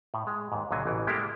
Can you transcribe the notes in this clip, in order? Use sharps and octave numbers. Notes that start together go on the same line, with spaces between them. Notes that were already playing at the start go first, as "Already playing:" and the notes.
A2
G#3
D#2 G#2
C#2 A#2 D3 F#3 G#5
A1 B2 E3
G3 G#3 A#3 B3 E4 G4